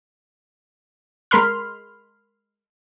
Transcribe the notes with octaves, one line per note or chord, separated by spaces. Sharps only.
G#3 A#4 B5 C6 F6